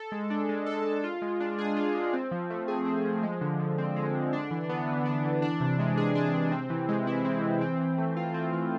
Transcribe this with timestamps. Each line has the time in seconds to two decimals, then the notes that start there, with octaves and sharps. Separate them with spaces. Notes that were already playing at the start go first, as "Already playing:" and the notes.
Already playing: A4
0.12 G#3
0.30 D4
0.49 G#3
0.66 A4
0.85 G#3
1.04 F4
1.22 G#3
1.40 D4
1.58 G#4
1.77 F4
1.95 G#3
2.13 C4
2.31 F3
2.50 A3
2.68 G#4
2.86 C4
3.05 F3
3.23 G#3
3.41 D3
3.59 F3
3.78 C4
3.96 G#3
4.15 D3
4.33 D4
4.51 E3
4.69 B3
4.87 E3
5.06 D4
5.24 E3
5.42 D4
5.60 C3
5.79 G#3
5.97 G#4
6.15 D4
6.33 C3
6.52 C4
6.70 E3
6.89 G#3
7.07 E4
7.25 C4
7.43 E3
7.61 C4
7.79 E3
7.98 A3
8.17 F4
8.34 C4
8.53 E3